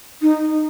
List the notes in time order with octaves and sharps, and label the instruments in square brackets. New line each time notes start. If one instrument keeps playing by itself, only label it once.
[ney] D#4